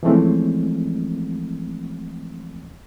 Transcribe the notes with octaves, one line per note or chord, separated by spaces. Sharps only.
E3 F3 G#3 A3 C4 C#4